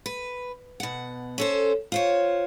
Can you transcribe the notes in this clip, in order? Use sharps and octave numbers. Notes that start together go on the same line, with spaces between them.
B4
B2 F#5
C#4 A4 C5
F4 C5 C#5